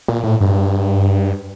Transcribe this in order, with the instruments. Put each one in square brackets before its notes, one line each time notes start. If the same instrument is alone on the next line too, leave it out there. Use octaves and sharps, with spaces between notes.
[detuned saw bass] A#2
A2
G2